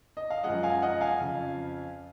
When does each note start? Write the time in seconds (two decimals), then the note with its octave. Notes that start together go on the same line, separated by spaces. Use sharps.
0.17 D#5
0.30 F5
0.43 F#2 F3 G#3 D#5 F#5
0.63 F5 G#5
0.82 D#5 F#5
1.01 F5 G#5
1.20 F2 C#3 F3